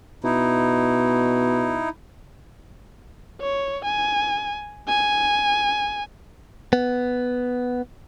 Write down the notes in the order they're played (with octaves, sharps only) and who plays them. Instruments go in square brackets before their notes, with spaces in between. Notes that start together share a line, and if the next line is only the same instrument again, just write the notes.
[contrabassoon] B2 [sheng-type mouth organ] D#4 E4
[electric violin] C#5
G#5
G#5
[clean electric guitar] B3